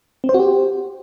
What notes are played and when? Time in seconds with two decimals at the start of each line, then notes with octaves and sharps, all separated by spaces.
0.24 C4
0.29 C5
0.34 F#4
0.40 G4